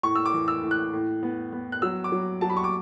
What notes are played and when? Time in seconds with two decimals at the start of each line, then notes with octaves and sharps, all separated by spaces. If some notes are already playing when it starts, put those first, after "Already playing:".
0.03 A2 C#6
0.16 E6
0.26 D6
0.33 E3
0.48 E6
0.63 A2
0.71 F#6
0.93 A2
1.23 B3
1.53 B3
1.72 F#6
1.82 F#3 E6
2.04 D6
2.12 F#3
2.41 F#3 A5
2.49 B5
2.57 C#6
2.64 D6